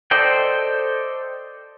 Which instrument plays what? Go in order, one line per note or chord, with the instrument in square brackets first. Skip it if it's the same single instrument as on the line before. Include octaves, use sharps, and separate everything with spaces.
[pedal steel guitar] A4 C5 D5 D#5 G5